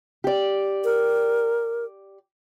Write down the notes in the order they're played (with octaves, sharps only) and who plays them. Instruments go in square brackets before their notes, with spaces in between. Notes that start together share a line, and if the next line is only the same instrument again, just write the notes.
[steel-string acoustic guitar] G4 D5
[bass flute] A#4